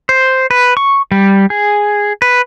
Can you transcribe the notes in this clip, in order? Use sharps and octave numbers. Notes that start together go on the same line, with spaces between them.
C5
B4
C#6
G3
G#4
B4